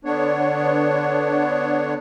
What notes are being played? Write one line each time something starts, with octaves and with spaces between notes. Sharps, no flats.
D3 B3 D4 C#5